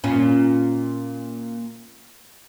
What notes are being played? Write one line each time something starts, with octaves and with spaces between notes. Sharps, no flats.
A#2 C#4